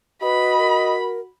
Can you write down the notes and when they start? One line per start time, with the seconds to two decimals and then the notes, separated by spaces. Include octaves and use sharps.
0.23 F#4 B4 D#5 B5
0.58 A#4